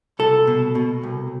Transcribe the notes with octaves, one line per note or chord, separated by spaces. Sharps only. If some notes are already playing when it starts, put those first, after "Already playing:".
C2 A4
B2
B2
C2